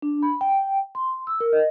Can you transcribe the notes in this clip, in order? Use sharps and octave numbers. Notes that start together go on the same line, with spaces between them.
D4
B5
G5
C6
E6
A#4
D#5